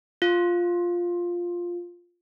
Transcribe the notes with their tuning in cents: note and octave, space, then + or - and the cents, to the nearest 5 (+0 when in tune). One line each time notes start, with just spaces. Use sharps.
F4 +5